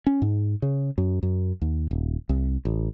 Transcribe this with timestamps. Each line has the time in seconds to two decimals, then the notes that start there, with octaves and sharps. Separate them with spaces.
0.07 C#4
0.22 G#2
0.62 C#3
0.98 F#2
1.23 F#2
1.62 D#2
1.91 D#1
2.29 C2
2.65 A1